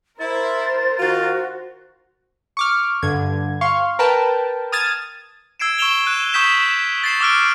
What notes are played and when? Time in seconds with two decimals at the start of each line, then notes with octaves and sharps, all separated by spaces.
0.19 E4 A#4 C5 A6
0.99 D#3 F4 F#4
2.57 C#6 D6 F6
3.03 G2 D3 G#6
3.61 F5 C6 C#6
3.99 A#4 B4 G5 A5
4.72 D#6 F6 G#6 A6 D#7 E7
5.60 E6 G#6 C7 D7 E7
5.78 C#6 E6 D7 E7 F7 G7
6.06 F#6 D#7
6.34 C#6 D#6 G6 B6 E7
7.04 A6 C7 E7
7.21 D6 E6 F6 D7